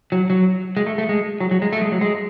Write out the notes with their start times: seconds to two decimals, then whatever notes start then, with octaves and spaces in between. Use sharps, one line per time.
0.12 F#3
0.30 F#3
0.77 G#3
0.87 A3
0.98 A3
1.09 G#3
1.40 F#3
1.51 F#3
1.62 G#3
1.73 A3
1.82 G#3
1.92 F#3
2.01 G#3